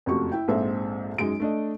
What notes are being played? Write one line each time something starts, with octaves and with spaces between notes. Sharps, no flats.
F#1 F2 A3 F#4 G4 C#6
E4 G5
A#1 G#2 C4 A4 E5
F#2 G#3 D#4 D7
A3 D4 D#5